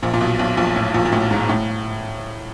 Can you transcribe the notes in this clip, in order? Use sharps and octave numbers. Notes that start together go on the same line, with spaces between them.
A#1 A#2
A#2
B1 B2
B1 B2
A#1 A#2
A2
A#1 A#2
A#2
A2
G#2
A2